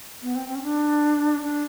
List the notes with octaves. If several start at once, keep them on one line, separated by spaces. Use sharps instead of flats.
B3
C4
C4
C#4
D4
D4